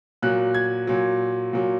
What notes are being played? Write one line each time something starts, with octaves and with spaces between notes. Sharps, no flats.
A#2 F#3 F#6
G#6
A#2 F#3
A#2 F#3